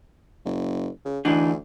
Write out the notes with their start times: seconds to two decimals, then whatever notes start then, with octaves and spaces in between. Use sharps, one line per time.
0.45 F#1
1.05 C#3
1.25 D2 E3 D4 D#4